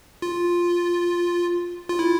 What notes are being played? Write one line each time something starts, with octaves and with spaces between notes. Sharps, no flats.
F4
F4
E4